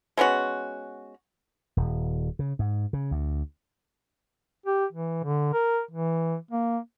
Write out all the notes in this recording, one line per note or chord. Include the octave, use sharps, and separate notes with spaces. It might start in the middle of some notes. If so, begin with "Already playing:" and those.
G#3 B3 C#4 F#4
D#1
C#3
G#2
C#3
D2
G4
E3
D3
A#4
E3
A#3